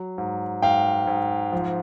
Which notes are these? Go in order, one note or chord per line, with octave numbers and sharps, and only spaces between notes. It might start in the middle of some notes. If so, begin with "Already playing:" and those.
Already playing: F#3
G#2
G#2 F5 G5
G#2
F3